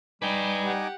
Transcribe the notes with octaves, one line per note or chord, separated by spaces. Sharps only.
G3 D#4 B4 G5 G#5 D6
G4 F#5